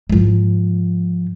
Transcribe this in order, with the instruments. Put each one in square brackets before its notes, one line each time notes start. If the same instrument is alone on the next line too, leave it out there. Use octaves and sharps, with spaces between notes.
[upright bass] G#2 F3